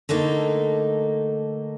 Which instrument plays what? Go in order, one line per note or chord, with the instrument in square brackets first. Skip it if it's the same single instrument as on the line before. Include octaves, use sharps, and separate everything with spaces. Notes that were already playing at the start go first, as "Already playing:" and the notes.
[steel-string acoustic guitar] D3 A3 A#3 D#4